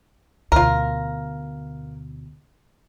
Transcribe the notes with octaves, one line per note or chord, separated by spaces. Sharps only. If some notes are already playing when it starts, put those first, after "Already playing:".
D2 B2 F4 A#4